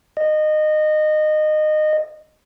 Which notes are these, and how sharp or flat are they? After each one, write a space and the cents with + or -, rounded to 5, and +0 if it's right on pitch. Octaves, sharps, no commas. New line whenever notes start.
D#5 -20